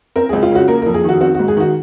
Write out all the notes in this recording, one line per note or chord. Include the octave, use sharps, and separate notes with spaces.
C4 A#4
C#2 G#4
F4
C#3 F#4
A#3 A#4
F2 A#4
G#4
D#3 F#4
C4 F#4
G#2 F#4
G#4
D#3 F#4